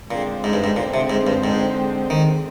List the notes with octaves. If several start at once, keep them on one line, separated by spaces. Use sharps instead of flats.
A#2 D3 G#3 C4
G#2
G2
G#2
A#2
C3
G#2
G2
G#2
D#3